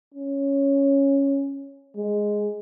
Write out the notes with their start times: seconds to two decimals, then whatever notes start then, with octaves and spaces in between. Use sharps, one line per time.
0.14 C#4
1.96 G#3